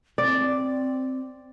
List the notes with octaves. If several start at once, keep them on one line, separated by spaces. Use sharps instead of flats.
C4 D5